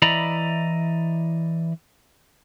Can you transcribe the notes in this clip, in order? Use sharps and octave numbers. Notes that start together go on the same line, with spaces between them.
E3 E4 D5 D#5 A#5 B5